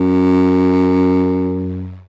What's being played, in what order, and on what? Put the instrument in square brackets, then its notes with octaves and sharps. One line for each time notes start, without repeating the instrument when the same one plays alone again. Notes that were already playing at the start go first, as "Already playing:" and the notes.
Already playing: [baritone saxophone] F#2